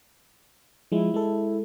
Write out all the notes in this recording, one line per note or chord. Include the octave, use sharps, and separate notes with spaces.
F3 G#3 E4
G#3 A4